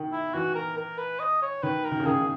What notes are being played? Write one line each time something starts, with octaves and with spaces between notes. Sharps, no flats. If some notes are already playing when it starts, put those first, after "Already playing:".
Already playing: D#3
E4
E3 F#4
A#4
A#4
B4
D#5
C#5
D#3 B4
A#4
D#3
C#3
D#3 G#4
D#3